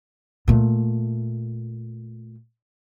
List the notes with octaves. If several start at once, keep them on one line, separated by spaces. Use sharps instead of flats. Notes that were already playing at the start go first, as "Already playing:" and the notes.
A#2 A3